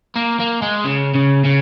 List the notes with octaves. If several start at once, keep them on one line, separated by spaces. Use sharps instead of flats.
A#3
A#3
G#3
C#3
C#3
C#3